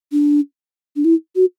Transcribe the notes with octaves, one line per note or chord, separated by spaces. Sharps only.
D4
D4
E4
F#4